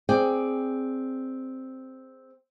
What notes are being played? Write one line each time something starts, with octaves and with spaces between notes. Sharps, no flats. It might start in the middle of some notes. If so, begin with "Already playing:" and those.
C4 G#4 D5 G5